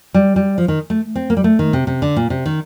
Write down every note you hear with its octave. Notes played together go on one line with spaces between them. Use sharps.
G3
G3
F3
D#3
A3
C4
A#3
G3
A3
D#3
C3
C3
D3
A#2
C3
D#3